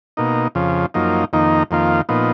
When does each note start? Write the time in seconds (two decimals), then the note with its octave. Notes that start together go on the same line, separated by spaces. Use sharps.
0.17 B2 A#3 D#4
0.55 F2 C#3 F3
0.94 F#2 F3 A#3 D#4
1.33 F2 D#3 A#3 D#4
1.71 F2 D#3 A#3 F4
2.09 A#2 F3 B3 D#4